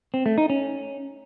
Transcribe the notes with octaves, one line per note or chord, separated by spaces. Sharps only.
C4
A3
D#4
C#4